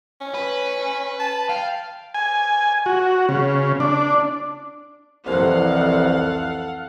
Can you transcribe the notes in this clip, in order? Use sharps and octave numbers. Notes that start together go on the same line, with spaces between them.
C#4
B4
A5
F5 G5
G#5
F#4
C#3
D4
C2 F2 E3 A4 F5 F#5